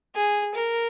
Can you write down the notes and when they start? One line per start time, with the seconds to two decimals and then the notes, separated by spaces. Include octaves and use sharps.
0.15 G#4
0.54 A#4